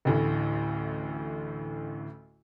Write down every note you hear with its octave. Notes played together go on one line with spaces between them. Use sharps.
A1 D2 A2